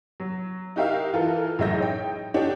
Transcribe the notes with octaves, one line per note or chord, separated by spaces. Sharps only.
F#3
D#4 F#4 G4 A#4 E5 F5
E3 F4 A4 A#4
A1 F#3 G#3 E5 G6 A#6
D#4 C#5 G5
D4 D#4 F#4 G4 A4 C#5